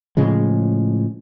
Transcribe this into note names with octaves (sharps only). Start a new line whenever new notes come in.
A2 C#3 F3 G#3